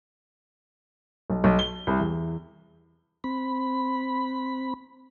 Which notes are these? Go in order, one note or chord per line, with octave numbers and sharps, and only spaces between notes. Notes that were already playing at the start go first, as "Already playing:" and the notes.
B1
B1
G7
C2
E2
C4 B5